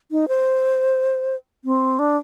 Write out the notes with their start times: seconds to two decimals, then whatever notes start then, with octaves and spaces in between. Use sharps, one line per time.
0.11 D#4
0.28 C5
1.65 C4
1.99 D4